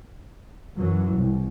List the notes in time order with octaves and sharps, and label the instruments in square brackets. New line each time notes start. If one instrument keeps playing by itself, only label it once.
[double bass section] F#2 E3 F#3
C2